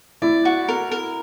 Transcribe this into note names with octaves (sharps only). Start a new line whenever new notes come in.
E4 D5
F#4
A#4
A#4